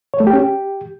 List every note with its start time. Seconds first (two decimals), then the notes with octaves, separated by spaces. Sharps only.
0.14 C#5
0.20 A3
0.27 G4
0.33 C#4
0.40 G4